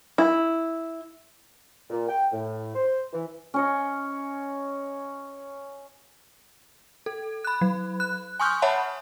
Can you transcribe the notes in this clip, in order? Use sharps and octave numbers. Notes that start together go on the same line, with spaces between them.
E4
A#2
G5
A2
C5
E3
C#4 C#5 D#5
A4
B5 F#6
F#3
F#6
G#5 C6 C#6 D#6 F6 G6
C#5 E5 F#5 A5 B5